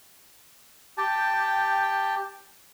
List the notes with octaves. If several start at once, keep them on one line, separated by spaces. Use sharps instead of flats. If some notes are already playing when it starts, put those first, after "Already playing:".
G4 G5 A5